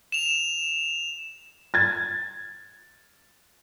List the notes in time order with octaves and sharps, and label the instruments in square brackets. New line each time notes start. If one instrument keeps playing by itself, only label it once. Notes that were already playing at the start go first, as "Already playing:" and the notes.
[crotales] E7 F7
[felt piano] G#6 A6